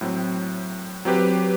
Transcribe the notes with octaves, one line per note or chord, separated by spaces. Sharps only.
A2 F#3 C4
F#3 C4 G4 B4